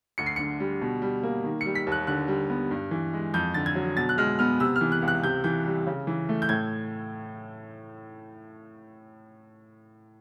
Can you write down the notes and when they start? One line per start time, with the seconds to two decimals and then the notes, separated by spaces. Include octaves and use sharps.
0.18 D2 C#7
0.26 C7
0.36 D3 C#7
0.60 G3
0.82 B2
1.02 G3
1.23 A#3
1.44 D#3
1.61 G3 C#7
1.75 B6
1.87 D#2
1.92 F#6
2.07 D3 F#6
2.28 G3
2.50 B3
2.71 G2
2.91 E3
3.13 G#3
3.34 F2 G6
3.54 D3 A6
3.66 G#6
3.75 F#3
3.97 B2 A6
4.09 F#6
4.18 G#3 F6
4.39 B3 F6
4.60 C3 E6
4.76 F6
4.81 E3
4.92 F#6
5.02 C#2
5.08 F#6
5.24 C3 G6
5.44 E3 G6
5.66 G3
5.87 C#3
6.07 E3
6.29 A3
6.42 G6
6.49 A2 G#6